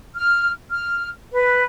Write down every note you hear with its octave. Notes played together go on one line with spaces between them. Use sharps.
F6
F6
B4